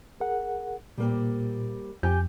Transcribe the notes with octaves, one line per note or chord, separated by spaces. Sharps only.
G#4 A#4 F#5
A#2 G3 A#3 C4
F2 G4 G#5 G6